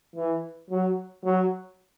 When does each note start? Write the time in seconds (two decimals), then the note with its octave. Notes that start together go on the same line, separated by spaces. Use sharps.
0.16 E3
0.70 F#3
1.24 F#3